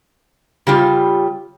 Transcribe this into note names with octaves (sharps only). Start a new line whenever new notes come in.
C#3 G3 F4 G4